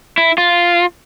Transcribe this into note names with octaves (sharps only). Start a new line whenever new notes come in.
E4
F4